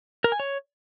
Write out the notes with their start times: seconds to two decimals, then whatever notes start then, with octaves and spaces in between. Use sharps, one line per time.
0.24 A#4
0.32 G#5
0.40 C#5